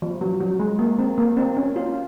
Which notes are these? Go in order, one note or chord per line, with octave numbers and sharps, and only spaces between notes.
F3
F#3
F#3
G#3
A#3
C4
A#3
C4
C#4
F4